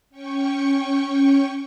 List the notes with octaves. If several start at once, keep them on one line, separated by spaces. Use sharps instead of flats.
C#4 G5 C#6